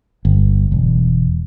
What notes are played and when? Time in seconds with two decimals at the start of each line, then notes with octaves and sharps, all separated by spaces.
0.25 G1
0.72 E1